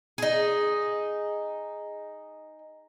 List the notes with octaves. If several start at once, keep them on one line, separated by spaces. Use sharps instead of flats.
D#4 G#4